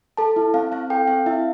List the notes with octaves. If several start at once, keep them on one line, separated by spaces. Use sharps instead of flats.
A4 A5
E4
C4 F5
C4 F5
A4 G5
C4 F5
E4 E5